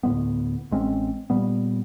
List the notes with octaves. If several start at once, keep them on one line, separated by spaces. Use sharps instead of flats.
D2 A2 G#3 B3
A1 G#3 C4 C#4
A#2 G3 B3